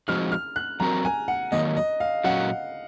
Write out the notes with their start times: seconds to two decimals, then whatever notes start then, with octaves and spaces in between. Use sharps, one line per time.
0.08 F3 G#3 C4 D#4 F#4 F6
0.32 F6
0.56 F#6
0.80 F#3 C4 F#4 A#4 A#5
1.05 G#5
1.28 F#5
1.52 D#3 F#3 A#3 D#5
1.77 D#5
2.00 F5
2.24 A#2 F#3 C#4 F#4 F#5